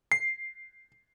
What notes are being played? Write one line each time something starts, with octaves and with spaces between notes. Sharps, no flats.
C7